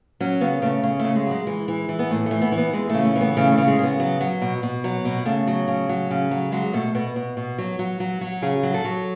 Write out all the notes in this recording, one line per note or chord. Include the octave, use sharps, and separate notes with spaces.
F#3 C#4
C#3 B3
C#3 A3
C#3
A3
C#3
G#3
F#3 G#3
E3
E3
E3
B3
A2 A3
A3
E3
B3
E3
B3
E3 G#3
C#3 A3
A3
E3
B3
C#3 A3
A3
C#3
G#3
C#3 B3
F#3
F#3
B2
B2
F#3
B2
C#3 A3
F#3
C#3
F#3
C#3
F#3
F#3 G#3
B2 A3
B2 B3
B2
B2
F#3
F#3
F#3
F#3
C#3 G#4
F#3
A4
F#3